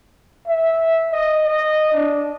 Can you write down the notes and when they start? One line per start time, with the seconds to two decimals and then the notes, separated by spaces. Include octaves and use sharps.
0.47 E5
1.12 D#5
1.45 D#5
1.92 D4